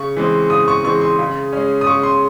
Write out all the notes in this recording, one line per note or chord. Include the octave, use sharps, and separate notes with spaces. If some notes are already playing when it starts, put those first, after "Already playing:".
Already playing: C#3 C#6
E3 G#3 C4
C#3 D#6
C#6
E3 G#3 C4 C#6
C6
C#3
G#3 C#4
D#6
C#3 C#6
C6